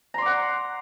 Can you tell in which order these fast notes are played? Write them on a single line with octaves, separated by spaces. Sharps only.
A#5 C6 D6 F#5